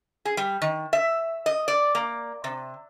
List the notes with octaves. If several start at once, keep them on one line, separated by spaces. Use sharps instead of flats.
G#4
G3
D#3
E5
D#5
D5
A#3
C3